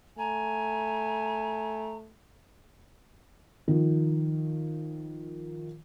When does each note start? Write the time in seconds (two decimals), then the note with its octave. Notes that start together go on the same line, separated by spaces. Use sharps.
0.18 A3 G#5 A#5
3.68 D#3 F3